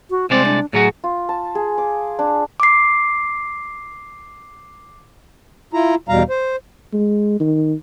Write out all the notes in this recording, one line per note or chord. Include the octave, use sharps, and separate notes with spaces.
F#4
C2 G#3 C4 D5
D4
A2 F#3 F#4 G#4
F4
A5
G#4
D6
D4
D6 C7
E4 F4 A#5
E2 B2 G3 F5 A#5
C5
G#3
D#3